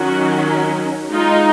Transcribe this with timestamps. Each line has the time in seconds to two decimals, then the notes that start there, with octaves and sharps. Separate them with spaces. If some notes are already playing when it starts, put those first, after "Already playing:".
Already playing: D#3 F#3 C#4 F#4
1.11 G#3 D#4 F4